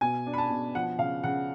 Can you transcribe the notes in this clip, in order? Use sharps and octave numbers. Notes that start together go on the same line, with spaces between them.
B2 G#5
D4
B5
A5
B2
F3 F#5
C#3 F5
C#3 F#5